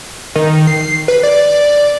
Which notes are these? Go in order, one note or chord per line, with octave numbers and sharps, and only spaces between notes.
D#3
C7
B4
D5